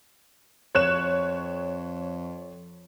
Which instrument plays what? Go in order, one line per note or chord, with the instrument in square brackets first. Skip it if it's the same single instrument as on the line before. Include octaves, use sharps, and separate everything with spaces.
[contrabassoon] F2 [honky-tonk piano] C#5 F#6 E7